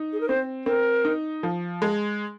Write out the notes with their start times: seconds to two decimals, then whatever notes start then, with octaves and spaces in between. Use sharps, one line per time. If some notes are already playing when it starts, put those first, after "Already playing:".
Already playing: D#4
0.13 G#4
0.21 A#4
0.29 C4 C5
0.66 C4 A#4
1.05 D#4
1.43 F3
1.82 G#3